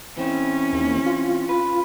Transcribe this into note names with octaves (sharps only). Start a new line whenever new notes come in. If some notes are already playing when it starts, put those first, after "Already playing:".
E3 C4 C#4
D#2
F4
B4